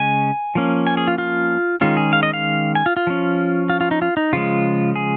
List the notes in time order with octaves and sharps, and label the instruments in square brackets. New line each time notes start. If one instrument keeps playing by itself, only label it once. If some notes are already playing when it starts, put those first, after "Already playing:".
Already playing: [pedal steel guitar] C#3 G#3 C#4 G#5
F3 A#3 C#4
G#5
G#4
F4
F4
D#3 G#3 C#4 F4
G#4
F5
D#5
F5
G#5
F4
F4
F3 C#4
F4
F4
D#4
F4
D#4
C#3 F3 G#3 F4
G#4